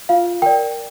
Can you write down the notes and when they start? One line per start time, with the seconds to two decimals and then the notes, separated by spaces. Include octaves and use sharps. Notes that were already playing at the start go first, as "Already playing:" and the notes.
0.09 F4 F5
0.42 A#4 D5 G5